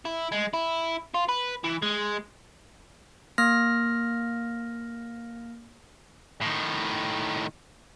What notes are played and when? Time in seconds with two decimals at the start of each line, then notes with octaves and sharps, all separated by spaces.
0.05 E4
0.32 G#3
0.54 E4
1.14 F4
1.29 B4
1.64 E3
1.82 G#3
3.38 A#3 F6 A#6
6.41 A2 D#3